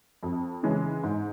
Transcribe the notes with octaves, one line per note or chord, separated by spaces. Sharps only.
F2
C#3 E3 G#3 C#4
G#2